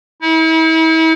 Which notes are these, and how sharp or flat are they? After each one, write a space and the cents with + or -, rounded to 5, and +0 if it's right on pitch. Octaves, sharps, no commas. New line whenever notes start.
E4 -40